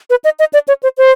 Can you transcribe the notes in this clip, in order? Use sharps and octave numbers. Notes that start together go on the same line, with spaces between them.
B4
D#5
D#5
D5
C#5
C5
C5